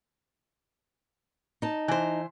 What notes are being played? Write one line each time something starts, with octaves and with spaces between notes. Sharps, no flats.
D#4 A5
E3 C5